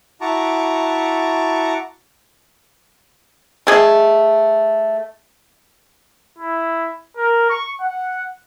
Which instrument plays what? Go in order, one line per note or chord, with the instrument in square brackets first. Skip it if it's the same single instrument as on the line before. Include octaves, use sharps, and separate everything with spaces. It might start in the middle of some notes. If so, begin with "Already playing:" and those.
[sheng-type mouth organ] E4 F#4 A5 A#5 C#6 D6
[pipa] A3 G#4 D#5
[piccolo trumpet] E4
A#4
C#6
F#5